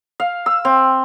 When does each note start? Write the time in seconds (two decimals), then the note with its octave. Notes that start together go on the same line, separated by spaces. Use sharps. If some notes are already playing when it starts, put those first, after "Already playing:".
0.20 F5
0.46 E6
0.65 C4